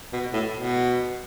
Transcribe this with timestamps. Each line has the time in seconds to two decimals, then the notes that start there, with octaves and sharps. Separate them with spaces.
0.13 B2
0.33 A2
0.54 B2